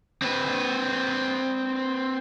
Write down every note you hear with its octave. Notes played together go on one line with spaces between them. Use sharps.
C4 B4